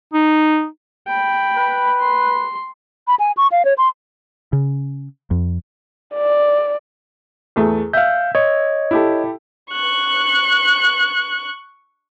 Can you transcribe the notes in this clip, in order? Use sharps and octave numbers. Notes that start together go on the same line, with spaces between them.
D#4
G5 B5
B4
C6
B5
G#5
C#6
F5
C#5
C6
C#3
F2
D5
E2 A3 G#4
E5 F5 G6
C#5 D#5 G#6
E4 G4 A4
C#6 F#6